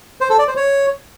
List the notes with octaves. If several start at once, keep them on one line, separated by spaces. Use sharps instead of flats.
C5
A4
D5
C5
C#5